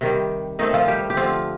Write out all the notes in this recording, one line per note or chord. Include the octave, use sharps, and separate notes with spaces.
C3 D#3 G3
D#3 A3 C4 D#4
F3 F4
G3 G4
G4
D3 F3 A3 C4 F4